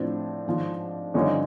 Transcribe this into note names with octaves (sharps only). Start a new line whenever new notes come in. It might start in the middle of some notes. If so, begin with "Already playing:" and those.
Already playing: A2 F3 C4 D4
G#2 F3
G2 D3 F3 C#4 D#4